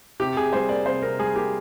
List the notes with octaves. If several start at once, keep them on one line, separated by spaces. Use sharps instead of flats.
C3 G4
C3 G#4
G3 C5
A#3 D5
C3 C5
C3 A#4
G3 G#4
A#3 G4